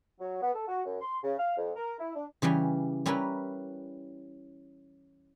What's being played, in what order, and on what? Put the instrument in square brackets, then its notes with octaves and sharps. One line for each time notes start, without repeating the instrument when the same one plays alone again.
[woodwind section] F#3
B3
A4
F#4
F#2
C6
C#3
F5
F2
A#4
E4
D4
[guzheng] C#3 E3 G3 C#4 G4
G3 C#4 E4 A#4 B4